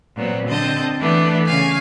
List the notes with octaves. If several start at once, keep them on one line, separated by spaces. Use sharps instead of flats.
A#2 F#3 B3 C4
D3 C4 D#5 A5 G6
E3 A3 B3 D4
C#3 F5 G#5 C#6